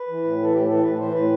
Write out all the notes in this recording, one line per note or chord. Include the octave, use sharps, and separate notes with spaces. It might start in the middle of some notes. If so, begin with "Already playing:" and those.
Already playing: B4
E3
A2
E3 A4
A2 G4
E3 A4
A2 B4
E3 C5
A2 B4